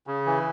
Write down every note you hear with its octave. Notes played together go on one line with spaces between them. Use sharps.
C#3
E3